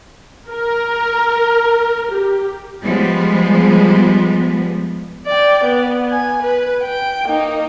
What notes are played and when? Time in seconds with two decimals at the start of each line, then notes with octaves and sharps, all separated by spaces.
0.50 A#4
2.11 G4
2.83 F3 G3 G#3 B3
5.27 D5 G5
5.64 B3
6.10 G#5
6.42 B4
6.82 G5
7.25 A#3 D#4